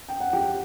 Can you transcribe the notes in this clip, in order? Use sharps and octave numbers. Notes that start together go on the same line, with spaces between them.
G5
F#5
G4 G5